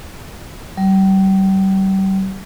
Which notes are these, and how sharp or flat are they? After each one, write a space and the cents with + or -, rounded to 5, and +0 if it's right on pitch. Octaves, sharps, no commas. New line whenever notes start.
G3 -35